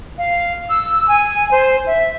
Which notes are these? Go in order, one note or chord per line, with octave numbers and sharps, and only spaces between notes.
F5
E6
G#5
C5
E5